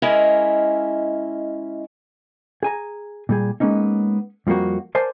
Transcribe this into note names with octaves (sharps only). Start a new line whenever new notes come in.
G#3 C#4 E4 A#4 D#5 E5
G#4 G#5 A#5
A#2 G3 G#4
G#3 A#3 B3 C#4 D#4
F2 F3 G3 A#3 F#4
A#4 C5 D5 G#5 A5